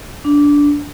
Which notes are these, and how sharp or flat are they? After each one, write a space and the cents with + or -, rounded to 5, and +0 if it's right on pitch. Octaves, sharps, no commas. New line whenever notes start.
D4 -15